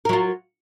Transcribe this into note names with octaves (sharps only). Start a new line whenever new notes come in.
F#3 F4 A#4